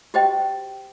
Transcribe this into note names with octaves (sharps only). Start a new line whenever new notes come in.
F#4 G4 C5 D#5 G5